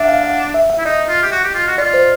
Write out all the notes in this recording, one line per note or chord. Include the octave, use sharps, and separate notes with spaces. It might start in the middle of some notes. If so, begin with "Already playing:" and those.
Already playing: D4 E5 F#5
F5
F5
E5
E5
E4
D#4 D#5
F4
G4
F#4
G4
F4
F#4
F4 D5
C5